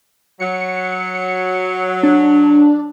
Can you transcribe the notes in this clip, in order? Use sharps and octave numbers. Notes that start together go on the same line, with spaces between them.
F#3 C#7
D4